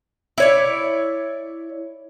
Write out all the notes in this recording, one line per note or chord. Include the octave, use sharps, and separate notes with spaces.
E4 C#5 D5